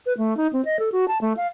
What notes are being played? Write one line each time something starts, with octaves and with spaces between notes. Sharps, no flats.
B4
A3
D#4
C4
D#5
A4
F#4
A5
A3
F5